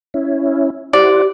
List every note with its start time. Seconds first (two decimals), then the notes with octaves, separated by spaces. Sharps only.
0.14 C#4 E4
0.93 E4 G4 C5 D5 F#5